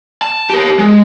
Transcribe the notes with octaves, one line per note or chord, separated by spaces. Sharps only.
A5
G4 A#4
G#3